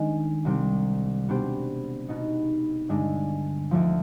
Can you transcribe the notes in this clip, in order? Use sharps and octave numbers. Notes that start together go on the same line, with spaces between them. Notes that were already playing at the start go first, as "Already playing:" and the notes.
Already playing: D#3 G#3 D4
C2 C3 G3 C4
B2 B3 D4 G4 C5
B2 B3 D#4
G2 D3 G#3 D4
D2 D3 F3